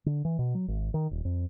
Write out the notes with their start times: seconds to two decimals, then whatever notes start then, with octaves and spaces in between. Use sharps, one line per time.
0.06 D3
0.25 E3
0.39 B2
0.55 F#3
0.68 G#1
0.94 D#3
1.11 D#1
1.25 F2